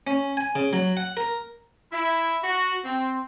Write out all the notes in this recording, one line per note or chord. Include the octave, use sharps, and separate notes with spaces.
C#4
G#5
C#3
F#3
F#5
A#4
E4
F#4
C4